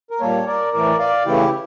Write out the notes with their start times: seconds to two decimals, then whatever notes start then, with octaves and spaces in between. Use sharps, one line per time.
0.11 A#4
0.21 A#2 G3 A#3 A4 C#5
0.46 A#4 D5
0.73 A2 E3 A3 A#4 D5
0.99 D5 F5
1.26 C#3 E3 A3 E4 G4